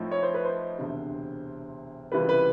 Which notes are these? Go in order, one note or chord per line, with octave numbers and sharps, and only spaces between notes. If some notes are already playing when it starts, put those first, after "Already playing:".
Already playing: A2 F3 A3 C4 D#4
C#5
C5
B4
C5
E1 D2 C3
C#2 C3 E3 G3 B4
B4